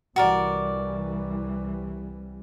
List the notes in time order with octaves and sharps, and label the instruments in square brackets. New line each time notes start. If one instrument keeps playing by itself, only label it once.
[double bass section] C2 E3 G3 [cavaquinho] F#4 A#4 D5